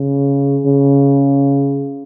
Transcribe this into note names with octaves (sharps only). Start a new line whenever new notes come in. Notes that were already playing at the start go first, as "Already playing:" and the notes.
Already playing: C#3
C#3